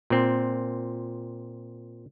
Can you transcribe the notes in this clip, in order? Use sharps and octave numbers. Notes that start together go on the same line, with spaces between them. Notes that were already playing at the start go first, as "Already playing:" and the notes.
A#2 C4